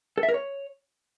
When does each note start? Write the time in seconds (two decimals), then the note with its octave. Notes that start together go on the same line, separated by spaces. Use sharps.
0.18 A4
0.23 E5
0.29 A#4
0.34 C#5